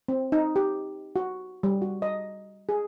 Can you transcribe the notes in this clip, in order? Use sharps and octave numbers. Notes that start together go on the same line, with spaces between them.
C4
D#4
G4
F#4
G3
F#4
D#5
G#4